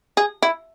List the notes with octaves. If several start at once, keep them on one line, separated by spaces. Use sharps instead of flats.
G#4
E4